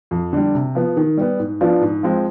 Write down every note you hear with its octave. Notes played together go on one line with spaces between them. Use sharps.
F2
D3 G3
C3
F3 B3
D#3
G3 B3
G#2
F3 B3 D4 F4
G#2
F3 G#3 C4